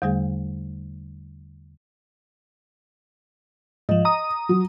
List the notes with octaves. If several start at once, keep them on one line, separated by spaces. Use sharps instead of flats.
E2 D3 G3 A3 G#4
G#2 F3 D#5
A#5 D#6
F#3